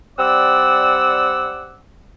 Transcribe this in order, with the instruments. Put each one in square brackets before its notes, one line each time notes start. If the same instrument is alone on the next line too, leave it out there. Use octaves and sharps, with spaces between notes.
[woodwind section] G3 C4 D5 F#5 E6